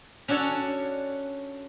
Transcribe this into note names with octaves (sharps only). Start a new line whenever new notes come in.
C#4 D4 F#4 A4 C#5